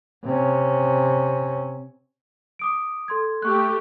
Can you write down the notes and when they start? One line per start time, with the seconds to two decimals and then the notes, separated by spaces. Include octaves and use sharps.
0.24 C3 C#4
2.59 D6 D#6 D7
3.08 A4 C6 G#6
3.42 A3 G4 C#6 F#6